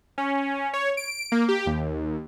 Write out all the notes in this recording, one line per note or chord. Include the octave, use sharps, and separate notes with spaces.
C#4
C#5
D7
A#3
G4
D#2